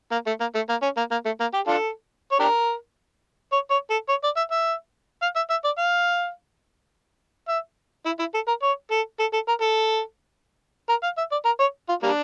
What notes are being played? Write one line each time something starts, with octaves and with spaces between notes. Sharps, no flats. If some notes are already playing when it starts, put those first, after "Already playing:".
A#3
A3
A#3
A3
A#3
C#4
A#3
A#3
A3
A#3
G4
D4 F4 A4
C#5
D4 G4 A#4
C#5
C#5
A4
C#5
D5
E5
E5
F5
E5
E5
D5
F5
E5
E4
E4
A4
A#4
C#5
A4
A4
A4
A#4
A4
A#4
F5
E5
D5
A#4
C#5
F4
G3 A#3 D4